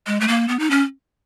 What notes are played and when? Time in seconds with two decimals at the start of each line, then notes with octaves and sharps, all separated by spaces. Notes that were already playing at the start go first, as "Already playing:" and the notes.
0.07 G#3
0.20 A3
0.28 A#3
0.48 B3
0.59 D#4
0.71 C#4